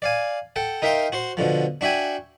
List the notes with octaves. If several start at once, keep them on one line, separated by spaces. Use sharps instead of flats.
D5 F5 G#5
A4 F#5 G5
D#4 A#4 E5 F5 G5 C6
F#4 C5 C6
B2 D3 F3
D4 F#4 E5 G5 G#5